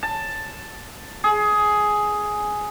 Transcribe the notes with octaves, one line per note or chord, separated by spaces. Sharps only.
A5
G#4